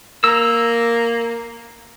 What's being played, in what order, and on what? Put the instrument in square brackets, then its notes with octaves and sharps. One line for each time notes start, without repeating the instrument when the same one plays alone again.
[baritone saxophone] A#3 [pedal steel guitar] A#5 E6